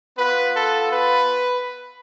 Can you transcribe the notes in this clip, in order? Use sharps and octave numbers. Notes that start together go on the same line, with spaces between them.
B3 F4 B4
A4
B4